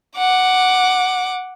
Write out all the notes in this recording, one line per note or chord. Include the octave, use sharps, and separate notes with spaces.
F#5 D6